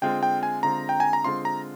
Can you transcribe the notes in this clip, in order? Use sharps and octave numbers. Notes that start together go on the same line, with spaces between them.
D3 G#3 C4 F4 G5
G5
G#5
D3 G#3 C4 F4 A#5
G5
G#5
A#5
D3 G#3 C4 F4 C6
A#5